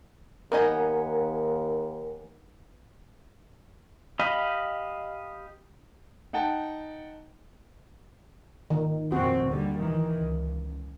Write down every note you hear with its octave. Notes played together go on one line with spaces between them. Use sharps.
D#2 B3 D#4 A#4 D#5 F#5 G#5
G4 D#5 F5 B5
D#4 F#5 G5 A5
D#3
F2 A#2 C4 F#4
D#2 D3 G3
D#3 E3
C#2